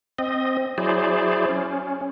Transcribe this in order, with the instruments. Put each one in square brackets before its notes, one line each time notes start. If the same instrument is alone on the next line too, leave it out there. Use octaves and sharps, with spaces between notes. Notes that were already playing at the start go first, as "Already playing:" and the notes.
[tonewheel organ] C4 D#5
F#3 E4 G#4 C5 D5
C#4